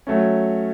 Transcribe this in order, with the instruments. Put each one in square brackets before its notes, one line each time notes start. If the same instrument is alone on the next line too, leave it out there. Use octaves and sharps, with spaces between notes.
[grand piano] F#3 A3 C#4